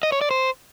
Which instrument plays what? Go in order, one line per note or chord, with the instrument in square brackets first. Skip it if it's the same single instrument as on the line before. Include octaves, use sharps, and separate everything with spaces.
[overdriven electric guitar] D#5
C#5
D5
C5